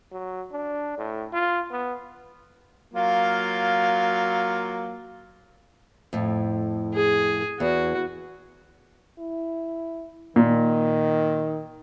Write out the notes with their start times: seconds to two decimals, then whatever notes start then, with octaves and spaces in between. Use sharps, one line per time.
0.11 F#3
0.52 D4
0.98 A2
1.33 F4
1.71 B3
2.94 F#3 A#3 F4
6.13 F2 A2
6.94 G#4
7.60 E2 F#4
9.19 E4
10.36 A#2 D#3